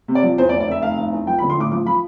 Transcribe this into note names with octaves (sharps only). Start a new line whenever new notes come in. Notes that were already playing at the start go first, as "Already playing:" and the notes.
C3
D5
F3
E2 C5
D5
F1
D5
F1 E5
F1 F5
F1
E2
F3 G5
B5
D3
C6
A1 D6
F3 D6
F3 B5